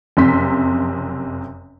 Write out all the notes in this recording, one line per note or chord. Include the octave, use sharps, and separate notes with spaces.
F#1 F2 C3 C6 B6